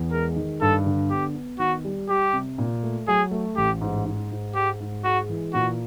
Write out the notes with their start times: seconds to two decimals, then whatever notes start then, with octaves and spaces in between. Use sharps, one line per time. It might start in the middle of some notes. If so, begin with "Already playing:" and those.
Already playing: E2
0.11 G#3 A#4
0.36 D#3
0.61 G2 A4
0.86 D3
1.10 B3 G4
1.35 B3
1.59 D#3 F#4
1.84 G3
2.09 G3 G4
2.33 C3
2.58 A#2
2.83 A3
3.08 F#3 G#4
3.31 A3
3.56 A1 G4
3.81 G#2
4.05 G#2
4.31 G#2
4.55 G#3 G4
4.80 G#2
5.04 G#3 F#4
5.29 E3
5.54 A#2 F#4